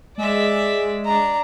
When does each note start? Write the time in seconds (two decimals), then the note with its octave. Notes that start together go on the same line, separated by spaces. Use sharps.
0.18 G#3 D5 E5
1.05 D4 A#5